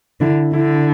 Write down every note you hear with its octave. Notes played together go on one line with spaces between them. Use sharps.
D3 E4
D3 E4